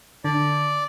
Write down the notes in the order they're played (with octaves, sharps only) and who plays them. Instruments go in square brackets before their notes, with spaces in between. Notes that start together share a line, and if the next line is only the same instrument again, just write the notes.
[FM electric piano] D3 [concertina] D5